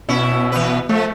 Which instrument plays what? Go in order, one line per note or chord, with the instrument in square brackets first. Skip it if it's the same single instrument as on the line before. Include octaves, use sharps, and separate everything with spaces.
[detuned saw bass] B2 [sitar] C#4 E4
[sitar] E3 B4
[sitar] F3 [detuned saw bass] A3